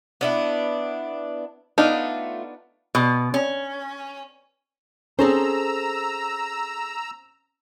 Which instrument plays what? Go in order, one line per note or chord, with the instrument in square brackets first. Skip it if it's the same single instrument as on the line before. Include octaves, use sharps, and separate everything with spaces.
[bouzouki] B3 D4 E4
[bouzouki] A3 F4 [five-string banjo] B3 D4 D#4
[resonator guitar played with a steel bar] B2
C#4
[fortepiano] C4 C#4 [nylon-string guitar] G#4 A4 C5 [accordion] A#5 E6